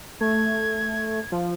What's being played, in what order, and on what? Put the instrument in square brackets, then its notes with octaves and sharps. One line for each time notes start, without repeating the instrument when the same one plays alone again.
[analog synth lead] A3 [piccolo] G#6
[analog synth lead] F3